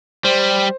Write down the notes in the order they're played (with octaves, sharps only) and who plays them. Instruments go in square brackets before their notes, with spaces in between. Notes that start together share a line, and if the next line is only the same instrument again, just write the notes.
[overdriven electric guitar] G3 [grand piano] C5